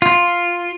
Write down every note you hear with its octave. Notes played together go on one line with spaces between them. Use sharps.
F4